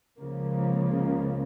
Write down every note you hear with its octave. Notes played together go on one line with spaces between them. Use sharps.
C#2 C#3 F3 A#3